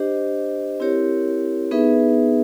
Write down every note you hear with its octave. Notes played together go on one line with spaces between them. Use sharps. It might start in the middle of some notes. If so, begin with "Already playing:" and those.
Already playing: D4 G4 C5 D#5
C4 E4 G4 A#4 C#5
B3 D#4 G#4 B4 E5